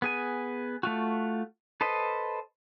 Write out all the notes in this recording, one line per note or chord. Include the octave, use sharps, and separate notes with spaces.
B3 G#4 G#5
A3 F4 F#4
A4 B4 C5 D#5